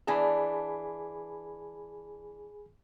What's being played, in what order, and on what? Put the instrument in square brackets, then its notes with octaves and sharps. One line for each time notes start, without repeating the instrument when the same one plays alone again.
[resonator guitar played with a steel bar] E3 D4 A5 [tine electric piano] G#4 G#5 B5